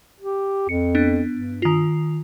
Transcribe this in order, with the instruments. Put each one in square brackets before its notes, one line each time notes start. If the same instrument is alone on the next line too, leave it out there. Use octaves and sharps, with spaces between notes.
[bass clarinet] G4
[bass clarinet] F2 [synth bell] C#7
[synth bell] B3 D4
[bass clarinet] G2
[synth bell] D#3 F4